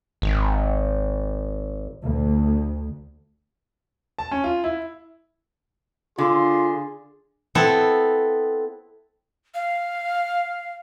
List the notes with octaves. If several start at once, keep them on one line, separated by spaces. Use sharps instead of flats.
G#1
D2
A5
C#4
F4
E4
D3 F4 G#4 C6
B3 C4 E4 A4
F5